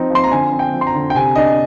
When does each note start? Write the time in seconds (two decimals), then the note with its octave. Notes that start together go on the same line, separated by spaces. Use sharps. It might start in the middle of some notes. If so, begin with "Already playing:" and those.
Already playing: F3 C4 D#4
0.10 F3 C6
0.24 A#5
0.32 D3 G#5
0.52 C4
0.59 G5
0.73 F3
0.81 C6
0.87 A#5
0.95 D3
1.10 G5
1.15 C3 G#5
1.36 D4 D#5